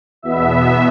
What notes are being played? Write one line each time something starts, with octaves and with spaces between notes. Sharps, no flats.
E2 B2 B3 E5